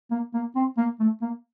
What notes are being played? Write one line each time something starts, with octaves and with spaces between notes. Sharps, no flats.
A#3
A#3
C4
A#3
A3
A#3